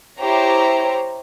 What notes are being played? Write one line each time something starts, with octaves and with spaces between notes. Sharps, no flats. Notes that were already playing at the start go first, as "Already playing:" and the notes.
E4 G4 C5 C#5 A#5